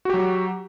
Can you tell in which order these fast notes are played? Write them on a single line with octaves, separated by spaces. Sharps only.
F#4 G4 F#3